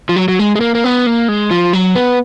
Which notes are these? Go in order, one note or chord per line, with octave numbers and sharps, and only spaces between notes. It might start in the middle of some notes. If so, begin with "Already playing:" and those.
F3
F#3
F#3
G#3
G#3
A#3
A#3
B3
A#3
G#3
F3
F#3
B3